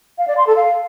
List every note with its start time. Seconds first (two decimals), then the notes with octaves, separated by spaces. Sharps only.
0.18 F5
0.28 D5
0.37 C6
0.47 A4
0.56 F5